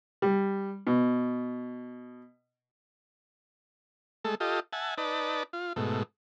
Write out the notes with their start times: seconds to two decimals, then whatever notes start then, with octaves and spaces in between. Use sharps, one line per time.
0.22 G3
0.87 B2
4.25 G#3 A3 A4
4.40 F4 G4 A4 D#5
4.73 E5 F#5 G#5 A5
4.98 D#4 B4 D5 A5
5.53 F4
5.76 G#2 B2 A3